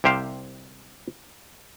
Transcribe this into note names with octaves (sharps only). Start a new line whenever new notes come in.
C2 C3 G4 C5 F5